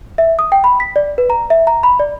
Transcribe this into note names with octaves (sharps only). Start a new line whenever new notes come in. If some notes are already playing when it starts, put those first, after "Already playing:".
E5
D#6
G5
B5
B6
D5
B4
A#5
E5
A#5
B5
D5